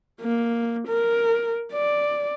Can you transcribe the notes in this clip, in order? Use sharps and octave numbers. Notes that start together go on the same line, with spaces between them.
A#3
A#4
D5